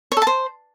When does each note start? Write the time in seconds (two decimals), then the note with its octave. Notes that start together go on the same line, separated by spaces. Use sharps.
0.12 C#5
0.17 A4
0.22 A5
0.27 C5